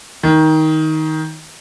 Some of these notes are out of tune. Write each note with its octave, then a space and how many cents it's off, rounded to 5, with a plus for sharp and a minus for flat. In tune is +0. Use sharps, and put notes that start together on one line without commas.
D#3 +15